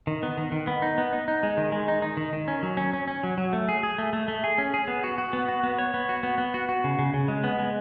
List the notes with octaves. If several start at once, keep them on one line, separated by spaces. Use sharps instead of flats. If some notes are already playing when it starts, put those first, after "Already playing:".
D#3
B3
D#3
D#3
B3
D#4
B3
D#4
D#4
G#3
D#3
G#3
D#4
D#4
D#3
D#3
C#4
F#3
C#4
C#4
C#4
F#3
F#3
A3
G#4
G#4
A3
A3
A3
G#4
C#4
G#4
B3
F#4
F#4
B3
F#4
B3
C#5
B3
F#4
B3
B3
F#4
F#4
C#3
C#3
C#3
G#3
B3
G#3